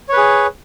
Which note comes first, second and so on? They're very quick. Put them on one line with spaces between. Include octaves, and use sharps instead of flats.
C#5 B4 G#4